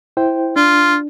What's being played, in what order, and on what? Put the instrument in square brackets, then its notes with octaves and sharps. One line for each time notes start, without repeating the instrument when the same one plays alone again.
[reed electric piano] E4 C5 G5
[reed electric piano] D4 [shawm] F4